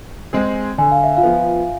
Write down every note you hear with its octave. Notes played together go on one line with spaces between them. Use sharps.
G#3 C4 G#4
D3 G#5
F5
E5
F4 F5
F3 B3